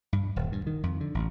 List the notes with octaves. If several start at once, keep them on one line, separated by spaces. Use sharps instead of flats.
G2
D#1
G2
D#3
F2
D3
A1